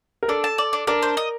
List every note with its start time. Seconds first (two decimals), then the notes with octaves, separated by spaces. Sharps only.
0.23 A#4
0.28 D4 A4
0.44 A5
0.58 D5
0.73 D4
0.87 D4 A#4
1.02 C5
1.17 D#5